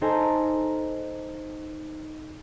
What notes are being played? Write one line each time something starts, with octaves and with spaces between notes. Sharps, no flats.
D#4 A4 C5 G#5 A#5